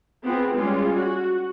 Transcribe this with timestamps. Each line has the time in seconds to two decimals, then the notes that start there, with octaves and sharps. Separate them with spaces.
0.23 B3 C4 F4 G#4
0.55 G3 G#3 C#4 F4
0.95 F#4